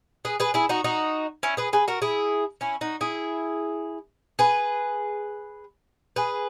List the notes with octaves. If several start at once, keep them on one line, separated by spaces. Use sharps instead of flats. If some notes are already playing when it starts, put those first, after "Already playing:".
G#4 B4
G#4 B4
E4 G#4
D#4 F#4
D#4 F#4
C#4 E4
G#4 B4
G#4 B4
F#4 A#4
E4 G#4
C#4 E4
D#4 F#4
E4 G#4
G#4 B4
G#4 B4